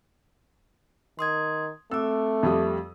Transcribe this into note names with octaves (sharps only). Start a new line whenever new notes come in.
D#3 C6 D#6 G#6
A3 C4 D6 E6
F2 G3 D#6